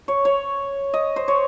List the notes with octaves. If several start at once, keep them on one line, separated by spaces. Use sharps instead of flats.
C#5
C#5
D#5
C5
C#5